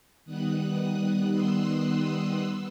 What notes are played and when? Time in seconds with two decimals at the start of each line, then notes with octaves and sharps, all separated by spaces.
0.25 D#3 G3 B3 D#6 F#6
0.79 D#6 F#6
1.32 C6 E6
1.86 D#6 F#6
2.39 B3 E6